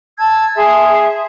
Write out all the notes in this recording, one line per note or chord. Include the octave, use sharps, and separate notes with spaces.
A5 E6 G#6
G#4 E5 C6